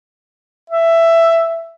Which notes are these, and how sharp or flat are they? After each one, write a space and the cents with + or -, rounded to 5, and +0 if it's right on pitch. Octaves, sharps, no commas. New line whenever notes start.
E5 +10